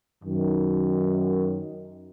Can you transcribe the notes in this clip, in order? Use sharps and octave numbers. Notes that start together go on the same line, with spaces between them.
F#2 D#3